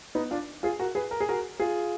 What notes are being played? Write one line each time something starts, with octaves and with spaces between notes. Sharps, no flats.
B3 D#4
D4 F4
F4 G#4
F#4 A#4
G#4 B4
A#4
G#4
F#4 A#4
F4 G#4